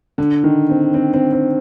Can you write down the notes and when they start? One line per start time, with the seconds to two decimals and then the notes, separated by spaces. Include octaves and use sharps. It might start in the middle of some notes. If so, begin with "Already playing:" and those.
0.18 D3
0.44 D#3
0.70 C4
0.94 C4
1.14 C4
1.33 C4